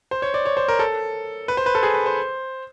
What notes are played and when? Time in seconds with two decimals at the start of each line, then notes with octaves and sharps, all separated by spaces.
0.11 C5
0.22 C#5
0.34 D5
0.45 C#5
0.57 C5
0.68 A#4
0.79 A4
1.48 B4
1.57 C5
1.66 B4
1.75 A4
1.83 G#4
1.94 B4
2.06 C5